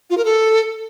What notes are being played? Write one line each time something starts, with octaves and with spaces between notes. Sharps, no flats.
F4
A#4
A4